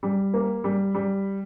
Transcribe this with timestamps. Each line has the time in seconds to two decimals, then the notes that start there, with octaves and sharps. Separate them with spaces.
0.03 G3
0.33 A#3
0.64 G3
0.94 G3